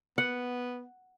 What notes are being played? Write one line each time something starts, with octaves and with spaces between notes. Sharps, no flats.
B3 F#5